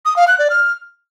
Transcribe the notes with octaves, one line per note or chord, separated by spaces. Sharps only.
D#6
F5
F#6
D5
F6